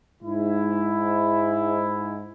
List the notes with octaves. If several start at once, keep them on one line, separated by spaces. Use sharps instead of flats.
G#2 E4